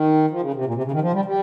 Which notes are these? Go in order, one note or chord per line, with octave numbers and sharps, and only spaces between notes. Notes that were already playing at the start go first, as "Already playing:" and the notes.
Already playing: D#3
F3
C#3
C3
A#2
C3
C#3
D#3
F3
G3
G3